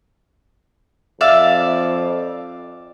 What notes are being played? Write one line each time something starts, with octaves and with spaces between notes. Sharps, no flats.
F2 D5 E5 F5